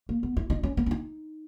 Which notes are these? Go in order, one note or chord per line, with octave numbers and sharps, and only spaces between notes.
A#3
B3
E4
D#4
C#4
B3
C#4
D#4